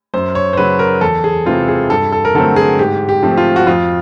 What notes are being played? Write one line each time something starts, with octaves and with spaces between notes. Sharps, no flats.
F#2 C5
C#5
C5
C#3 F#3 B4
A#4
E2 A4
G#4
C3 E3 G#3 C4 F4
G#4
G2 A4
A4
A#4
D3 F#3 A3 C4 A4
G#4
G#2 G4
G4
F3 A3 C4
F4
F#4
F2 F4